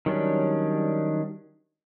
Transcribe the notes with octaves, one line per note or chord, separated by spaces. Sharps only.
D#3 F#3 G3 C#4 D4